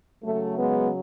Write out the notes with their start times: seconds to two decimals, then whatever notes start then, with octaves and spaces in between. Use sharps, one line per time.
0.24 C#3 F#3 A3
0.58 G#3 B3